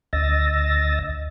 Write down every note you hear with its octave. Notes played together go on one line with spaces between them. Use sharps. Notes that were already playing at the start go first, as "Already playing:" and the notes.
D2 D#5 E6 A6 A#6